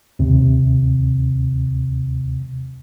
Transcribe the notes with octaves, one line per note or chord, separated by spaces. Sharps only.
D#2 C3